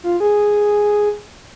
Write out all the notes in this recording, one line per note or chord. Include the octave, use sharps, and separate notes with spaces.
F4
G#4